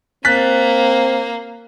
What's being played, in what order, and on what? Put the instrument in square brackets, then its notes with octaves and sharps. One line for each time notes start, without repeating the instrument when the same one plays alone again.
[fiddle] A#3 [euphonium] C4 [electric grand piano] F#6 A6 B6